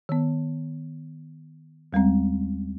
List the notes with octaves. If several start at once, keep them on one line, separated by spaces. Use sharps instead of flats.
D#3 B3
D#2 G3 G#3 C4